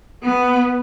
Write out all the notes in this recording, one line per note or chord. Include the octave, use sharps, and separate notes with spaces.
B3